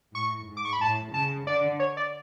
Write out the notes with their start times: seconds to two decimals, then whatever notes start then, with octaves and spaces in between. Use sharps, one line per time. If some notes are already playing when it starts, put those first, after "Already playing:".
0.15 A2 C#6
0.49 G#2
0.57 D6
0.65 C#6
0.73 B5
0.81 A2 A5
1.14 C#3 A5
1.47 D3 D5
1.80 C#5
1.97 D5